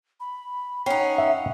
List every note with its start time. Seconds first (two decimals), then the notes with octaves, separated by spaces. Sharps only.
0.20 B5
0.86 C#4 D#4 F#5 G5 C7
1.18 E5